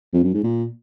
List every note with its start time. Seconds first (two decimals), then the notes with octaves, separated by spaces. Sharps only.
0.13 F2
0.23 F#2
0.34 G#2
0.43 A#2